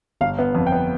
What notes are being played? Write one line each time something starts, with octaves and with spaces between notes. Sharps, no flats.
G1 F5
B3
F2
G5
B3